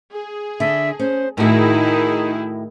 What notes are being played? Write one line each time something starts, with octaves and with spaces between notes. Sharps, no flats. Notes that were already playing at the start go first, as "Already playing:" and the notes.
G#4
D3 E5
C#4 C5
A2 D#3 D#4 E4 F#4 G#4